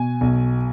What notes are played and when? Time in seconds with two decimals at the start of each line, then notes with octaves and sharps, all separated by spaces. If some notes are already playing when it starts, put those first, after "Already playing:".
Already playing: B2 G#5
0.21 B1